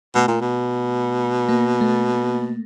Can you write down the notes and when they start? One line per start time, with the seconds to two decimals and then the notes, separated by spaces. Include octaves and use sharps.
0.15 B2 A3
0.28 A#2
0.41 B2
1.49 A#3
1.81 A3